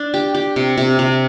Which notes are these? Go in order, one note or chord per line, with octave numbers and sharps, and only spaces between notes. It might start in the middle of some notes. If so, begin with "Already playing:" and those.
Already playing: D4
G4
G4
C3
C3
C3